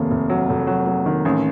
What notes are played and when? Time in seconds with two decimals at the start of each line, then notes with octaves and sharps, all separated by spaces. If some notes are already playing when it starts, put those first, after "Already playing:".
Already playing: F1 D#2
0.11 F1
0.30 F#3
0.49 F1
0.67 F#3
0.86 F#3
1.06 D#3
1.25 A1